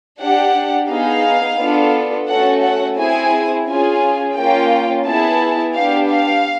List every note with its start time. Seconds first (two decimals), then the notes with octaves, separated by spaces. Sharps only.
0.21 D4 G4 F#5
0.91 B3 D#4 G#4 F5
1.60 B3 D4 F4 A4
2.29 A3 C#4 F#4 A4 F#5
2.64 F#5
2.98 C4 E4 G#4 G#5
3.67 C#4 F4 G#4 G#5
4.37 A#3 C#4 F4 G5
5.06 B3 E4 G#4 A5
5.75 B3 D4 G4 F5
6.10 F5